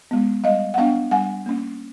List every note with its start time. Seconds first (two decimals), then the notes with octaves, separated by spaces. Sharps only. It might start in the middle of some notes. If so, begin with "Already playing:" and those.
0.11 G#3 B3
0.44 G3 D#5 F5
0.74 F#5
0.78 B3 D4 F5 G5
1.11 G3 F#5 G#5
1.46 A#3 C#4